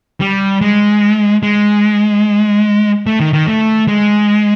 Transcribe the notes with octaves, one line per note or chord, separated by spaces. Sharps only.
G3
G#3
G#3
A3
D#3
D#3
A3
G#3